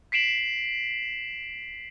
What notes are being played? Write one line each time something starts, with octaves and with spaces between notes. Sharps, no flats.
B6 C7 D7 E7 F#7